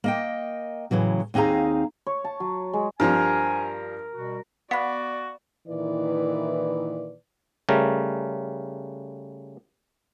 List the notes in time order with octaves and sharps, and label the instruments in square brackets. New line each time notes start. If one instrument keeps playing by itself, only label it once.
[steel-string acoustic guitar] A#3 D#5 G5
A2 C#3 E3 F#3
D#2 C4 D#4 G#4 F5 A#5
[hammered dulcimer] C#5
A5
F#3
G#3
[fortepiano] G2 F3 G3 [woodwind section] G4 C5 G#5 [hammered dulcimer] A#4
[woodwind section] B2 G3 F#4
[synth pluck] B3 [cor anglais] F#4 [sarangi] D5 [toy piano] F5 B5
[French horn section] A#2 D#3 E3 E4 B4 D5
[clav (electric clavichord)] C#3 G3 A3 A#4